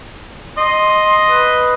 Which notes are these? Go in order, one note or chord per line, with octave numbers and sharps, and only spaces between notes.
D#5 C6
B4